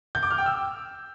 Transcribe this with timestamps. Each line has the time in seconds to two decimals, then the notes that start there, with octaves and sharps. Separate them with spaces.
0.15 G6
0.23 D6
0.30 F6
0.38 G5
0.46 E6